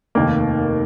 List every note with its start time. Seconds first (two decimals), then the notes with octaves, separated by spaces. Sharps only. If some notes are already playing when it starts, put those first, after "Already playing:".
0.15 F1 D#2 D#3 A#3